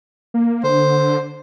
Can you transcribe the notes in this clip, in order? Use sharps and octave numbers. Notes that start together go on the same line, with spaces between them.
A#3
D3 C5